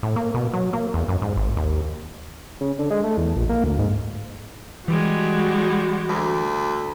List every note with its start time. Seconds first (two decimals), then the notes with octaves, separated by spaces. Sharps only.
0.03 A2
0.16 A#3
0.34 B2
0.54 F#3
0.73 A#3
0.94 E2
1.08 F#2
1.22 G#2
1.36 G#1
1.57 D#2
2.61 C#3
2.79 D3
2.90 G#3
3.04 A3
3.17 E2
3.36 A#1
3.49 A#3
3.64 D2
3.78 G#2
4.88 E3 G3 G#3 F#4
6.09 D2